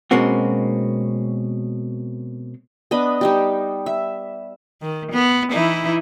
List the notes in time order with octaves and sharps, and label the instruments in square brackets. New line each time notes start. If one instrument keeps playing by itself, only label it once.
[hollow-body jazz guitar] B2 G#3 A#3 C4 C#4 F#4
[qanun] B3 D4 D#5 B5
G3 D#4 G4
E5
[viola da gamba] D#3
B3
E3 D#4 E4